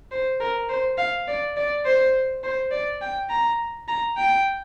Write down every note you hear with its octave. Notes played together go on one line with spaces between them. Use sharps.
C5
A#4
C5
F5
D5
D5
C5
C5
D5
G5
A#5
A#5
G5